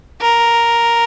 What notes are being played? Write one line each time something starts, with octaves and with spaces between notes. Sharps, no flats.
A#4